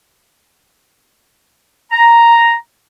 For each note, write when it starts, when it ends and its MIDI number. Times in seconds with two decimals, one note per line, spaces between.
1.91 2.53 82